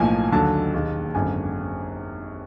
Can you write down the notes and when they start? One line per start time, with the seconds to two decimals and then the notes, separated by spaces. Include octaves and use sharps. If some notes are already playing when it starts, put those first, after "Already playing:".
Already playing: B1 A2 F3 A#3 G#5
0.32 D#2 D3 F#3 A5
0.74 E1 D#2 D#3
1.15 G#1 F#2 D3 G#5